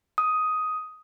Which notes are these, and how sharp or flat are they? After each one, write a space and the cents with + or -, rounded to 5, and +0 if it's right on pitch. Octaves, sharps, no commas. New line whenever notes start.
D#6 +10